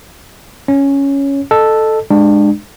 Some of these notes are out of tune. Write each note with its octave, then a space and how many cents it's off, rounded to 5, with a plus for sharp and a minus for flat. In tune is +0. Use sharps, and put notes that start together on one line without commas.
C#4 +0 C#5 +0
A4 +0 D#5 -25
G#3 +0 D4 +30